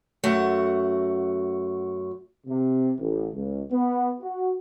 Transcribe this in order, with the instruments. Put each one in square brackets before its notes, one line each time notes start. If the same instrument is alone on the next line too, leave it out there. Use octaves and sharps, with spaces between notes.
[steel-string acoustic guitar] F#2 A3 F#4 F#5
[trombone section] C3
A1
C#2
B3
F#4